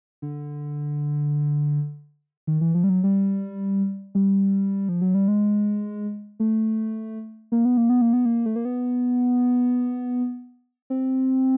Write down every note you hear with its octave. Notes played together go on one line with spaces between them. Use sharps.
D3
D#3
E3
F3
G3
F#3
G3
G3
F3
F#3
G3
G#3
A3
A#3
B3
A#3
B3
A#3
B3
A#3
A3
A#3
B3
C4